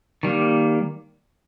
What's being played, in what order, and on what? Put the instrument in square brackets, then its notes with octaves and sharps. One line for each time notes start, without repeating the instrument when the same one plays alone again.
[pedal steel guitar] D#3 G3 A#3